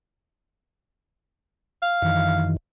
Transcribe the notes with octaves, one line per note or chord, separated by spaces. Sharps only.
F5
F#2 D#3 E3